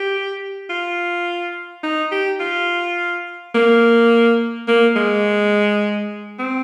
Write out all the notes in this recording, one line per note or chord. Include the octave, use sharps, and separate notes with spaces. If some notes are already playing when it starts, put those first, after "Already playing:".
Already playing: G4
F4
D#4
G4
F4
A#3
A#3
G#3
C4